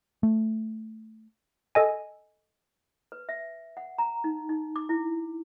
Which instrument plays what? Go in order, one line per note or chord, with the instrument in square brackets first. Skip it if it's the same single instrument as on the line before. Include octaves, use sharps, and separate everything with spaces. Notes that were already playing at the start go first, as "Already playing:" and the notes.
[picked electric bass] A3
[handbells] A4 D#5 G#5
[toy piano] B4
E5
F#5
A#5
D#4
D#4
D6
E4